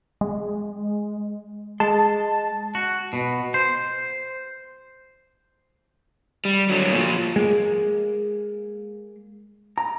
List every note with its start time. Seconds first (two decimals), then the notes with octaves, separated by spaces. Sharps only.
0.21 G#3
1.80 G#3 A5
2.75 F#4
3.13 B2
3.54 C5
6.45 G3
6.70 D3 F#3
6.92 A#2 F3
7.36 G#3 A#3
9.78 A#5